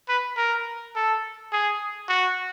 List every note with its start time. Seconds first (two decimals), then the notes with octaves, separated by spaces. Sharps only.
0.08 B4
0.37 A#4
0.95 A4
1.52 G#4
2.09 F#4